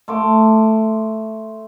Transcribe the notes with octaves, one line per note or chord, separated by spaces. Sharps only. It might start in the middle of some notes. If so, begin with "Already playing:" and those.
A3 C6 D6